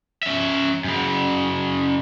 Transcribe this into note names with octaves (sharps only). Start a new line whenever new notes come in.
C#4 E5
F#2 C#3